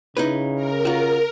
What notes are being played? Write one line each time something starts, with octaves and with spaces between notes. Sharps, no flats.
C#3 D#4 E4 B4
A#4
F4 F#4